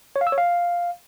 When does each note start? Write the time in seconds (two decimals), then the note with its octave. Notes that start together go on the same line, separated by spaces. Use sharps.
0.16 C#5
0.21 F5
0.27 E6
0.32 C#5
0.38 F5